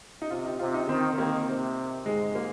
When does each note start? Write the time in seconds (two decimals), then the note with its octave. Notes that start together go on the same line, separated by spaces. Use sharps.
0.22 D#4
0.30 C3 F4
0.45 D#4
0.59 C3 F4
0.74 D#4
0.89 D#3 C4
1.18 D#3 A#3
1.47 C3
2.05 G#2 G#3
2.35 A#3